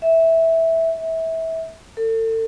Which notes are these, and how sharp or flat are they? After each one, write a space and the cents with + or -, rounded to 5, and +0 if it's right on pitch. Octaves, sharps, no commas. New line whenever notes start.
E5 -10
E5 -25
A4 +35